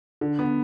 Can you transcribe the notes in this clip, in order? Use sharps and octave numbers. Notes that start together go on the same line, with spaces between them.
D3
B3